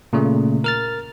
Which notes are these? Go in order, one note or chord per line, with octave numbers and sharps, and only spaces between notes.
A#2 C#3 A3
A#4 F6 A6